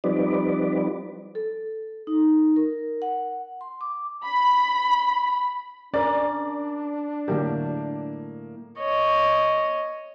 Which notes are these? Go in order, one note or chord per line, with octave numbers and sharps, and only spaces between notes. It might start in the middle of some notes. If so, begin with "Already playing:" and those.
F3 G3 C4 D#4 B4 D5
A4
D#4
A#4
F#5
C6
D6
B5
C#4 D4 A#4 D5
A2 D3 F#3 A#3 G4
C#5 D#5